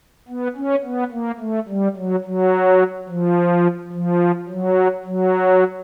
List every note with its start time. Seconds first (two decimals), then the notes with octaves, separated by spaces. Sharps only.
0.28 B3
0.56 C#4
0.84 B3
1.12 A#3
1.40 A3
1.68 G3
1.96 F#3
2.25 F#3
3.09 F3
3.93 F3
4.49 F#3
5.05 F#3